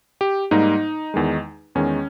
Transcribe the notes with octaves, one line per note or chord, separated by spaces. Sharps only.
G4
G#2 G3 A#3 D#4
E2 D#3 G#3
E2 D#3 G#3 C#4